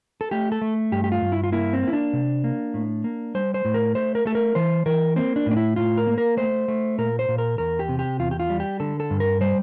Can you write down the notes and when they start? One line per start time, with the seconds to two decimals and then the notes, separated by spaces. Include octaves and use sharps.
0.21 A4
0.31 A3 G4
0.52 A4
0.62 A3
0.92 G2 G4
1.04 G4
1.12 F4
1.22 G2
1.32 E4
1.44 F4
1.52 A#3 E4
1.73 C4
1.82 A#3
1.88 E4
1.93 D4
2.13 C3
2.44 A#3
2.74 A2
3.04 A#3
3.35 G3 C5
3.54 C5
3.65 A2
3.74 A#4
3.95 A3 C5
4.15 A#4
4.26 A3 A4
4.35 A#4
4.55 E3 C5
4.86 E3 A#4
5.16 A#3 C4
5.36 D4
5.46 A2 D4
5.57 E4
5.76 A2 F4
5.97 A#4
6.07 A#3
6.18 A#4
6.37 A3 C5
6.68 A3
6.98 A#2 A#4
7.19 C5
7.28 A#2
7.38 A#4
7.58 E2 A#4
7.79 G4
7.89 C3
7.99 G4
8.20 E2 F4
8.31 G4
8.40 F4
8.50 G3
8.60 G4
8.80 D3 A4
9.00 A4
9.10 G2
9.20 A#4
9.41 G3 C5